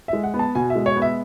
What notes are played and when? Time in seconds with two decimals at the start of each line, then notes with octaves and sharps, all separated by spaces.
0.08 G#3 E5
0.24 F#5
0.34 B3
0.39 A5
0.55 B2 G#5
0.70 E5
0.75 G#3
0.86 C#5
0.96 B3
1.02 E5